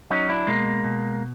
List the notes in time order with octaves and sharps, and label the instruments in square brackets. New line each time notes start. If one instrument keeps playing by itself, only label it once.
[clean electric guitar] F#3 C#4 D#4
D4 E4
B2 G#3 A#3
B2